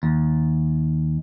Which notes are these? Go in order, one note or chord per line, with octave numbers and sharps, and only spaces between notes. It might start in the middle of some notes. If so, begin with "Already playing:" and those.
D#2